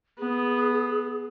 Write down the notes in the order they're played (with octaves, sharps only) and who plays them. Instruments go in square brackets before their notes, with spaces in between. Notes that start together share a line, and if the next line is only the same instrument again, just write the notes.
[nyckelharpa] B3 [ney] G#4